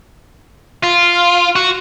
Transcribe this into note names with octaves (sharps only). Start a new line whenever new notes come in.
F4
F#4